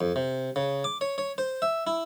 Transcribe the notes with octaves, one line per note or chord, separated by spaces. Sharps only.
F2
C3
C#3
D6
C#5
C#5
C5
E5
E4